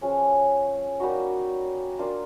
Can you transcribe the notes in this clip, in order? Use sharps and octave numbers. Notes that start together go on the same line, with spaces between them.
F3 G#3 C#4
G3 A#3 D#4 F#4
A#3 D4 F4